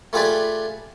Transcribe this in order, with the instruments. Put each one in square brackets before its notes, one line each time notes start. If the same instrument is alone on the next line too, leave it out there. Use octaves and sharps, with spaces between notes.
[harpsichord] A3 F4 G4 G#4 B4 D5